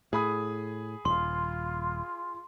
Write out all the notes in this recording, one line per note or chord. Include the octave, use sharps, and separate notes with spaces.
A2 G#4 B5 D#6
D#1 F4 C6